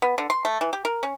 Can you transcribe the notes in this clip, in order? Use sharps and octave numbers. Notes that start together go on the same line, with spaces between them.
B3
D3
C6
A3
E3
G4
A#4
C#4